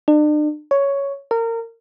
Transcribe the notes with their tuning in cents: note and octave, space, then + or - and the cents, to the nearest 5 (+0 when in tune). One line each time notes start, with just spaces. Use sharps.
D4 +40
C#5 +5
A#4 -25